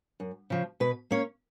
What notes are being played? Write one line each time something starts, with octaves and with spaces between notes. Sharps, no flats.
F#2
C#3 F3
B2 B4
A#3 C#4 C#5